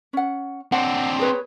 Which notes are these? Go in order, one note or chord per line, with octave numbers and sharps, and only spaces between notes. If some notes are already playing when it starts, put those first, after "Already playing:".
C#4 F#5
C4 D4 F#5
G#4 B4 C#5